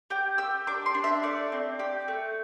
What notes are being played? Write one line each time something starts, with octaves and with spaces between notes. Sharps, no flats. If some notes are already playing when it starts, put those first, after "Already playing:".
G4 G5
G4 E6
D4 D6
C6
D4
E5
A3 D5
C4
G4
A3